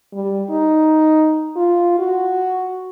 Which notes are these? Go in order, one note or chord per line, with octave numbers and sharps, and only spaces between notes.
G3
D#4
F4
F#4